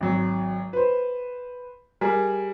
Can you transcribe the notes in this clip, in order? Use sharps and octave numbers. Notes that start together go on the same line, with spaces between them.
G#1 F#3
B4 C5
G3 G#4 A#4